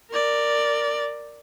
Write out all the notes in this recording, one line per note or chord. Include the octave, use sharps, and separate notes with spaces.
A#4 D5